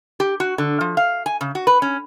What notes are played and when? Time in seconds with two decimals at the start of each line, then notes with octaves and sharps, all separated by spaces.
0.20 G4
0.40 F#4
0.58 D3
0.81 F3
0.97 F5
1.26 G#5
1.41 C#3
1.55 F#4
1.67 B4
1.82 C#4